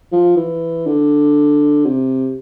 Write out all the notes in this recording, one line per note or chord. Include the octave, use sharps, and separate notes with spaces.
F3
E3
D3
C3